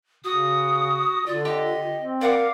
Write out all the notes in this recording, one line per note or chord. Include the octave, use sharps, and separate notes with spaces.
C#3 F#4 D#6
D3 F4 D5
G4 D#5
C4
A#4 D5 F5 F#5 D6